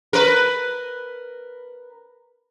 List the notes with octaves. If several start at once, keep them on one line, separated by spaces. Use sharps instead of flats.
A#4 B4